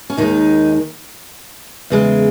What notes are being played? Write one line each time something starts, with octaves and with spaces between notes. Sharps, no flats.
C#4
D#2 D#3 G#3 D#4
E2 C#3 G#3